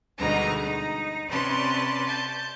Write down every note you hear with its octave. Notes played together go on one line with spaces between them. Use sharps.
D2 B2 G3 G#3 D#4 A#5
D#4
C3 C#4 B4 D5 A5 C6
A5 G6